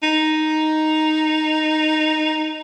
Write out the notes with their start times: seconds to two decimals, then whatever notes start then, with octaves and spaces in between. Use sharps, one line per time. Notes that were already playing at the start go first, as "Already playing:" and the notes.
0.03 D#4